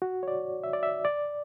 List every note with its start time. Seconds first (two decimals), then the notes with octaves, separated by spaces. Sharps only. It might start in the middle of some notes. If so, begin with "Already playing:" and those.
0.02 F#4
0.23 C#5
0.28 D5
0.64 E5
0.73 D5
0.83 E5
1.05 D5